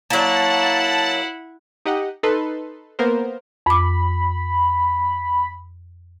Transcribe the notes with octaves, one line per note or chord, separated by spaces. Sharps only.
F#3 A#3 E4 F#5 A5
D#4 G4 D#5 F#5
D#4 A4 B4 C6
A#3 B3 A#4 C5
F2 B5 D6